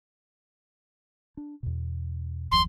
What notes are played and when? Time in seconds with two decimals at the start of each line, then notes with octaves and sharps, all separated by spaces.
1.37 D4
1.63 E2 B2
2.52 F#1 D#2 F3 C6